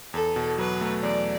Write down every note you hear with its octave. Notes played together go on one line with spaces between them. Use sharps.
E2 A4
B2
F#3 B4
A3
E2 D5